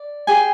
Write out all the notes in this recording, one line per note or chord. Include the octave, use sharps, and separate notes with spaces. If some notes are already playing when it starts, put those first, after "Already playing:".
Already playing: D5
G4 G#4 D5 G#5